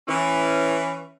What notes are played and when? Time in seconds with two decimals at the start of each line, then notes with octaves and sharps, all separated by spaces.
0.08 E3 C#4